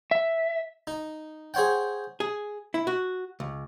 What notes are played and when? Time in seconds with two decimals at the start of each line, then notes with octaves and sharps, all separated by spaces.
0.11 E5
0.87 D#4
1.54 G#4 C5 C#5 F#5 G5
2.20 G#4
2.74 E4
2.87 F#4
3.40 C#2